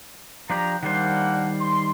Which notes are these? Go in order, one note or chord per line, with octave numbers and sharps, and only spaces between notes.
F3 D4 G4 A#5
D#3 G3 A#3 D4 C5 F#5
C6